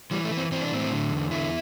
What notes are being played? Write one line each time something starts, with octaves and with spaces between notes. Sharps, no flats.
E3 G3
A3
E3
C4
E3 C4
D4
A2 C4
D3
E2
D3 E4